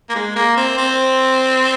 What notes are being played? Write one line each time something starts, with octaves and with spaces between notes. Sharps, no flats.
A#3
G#3
A#3
C4
C4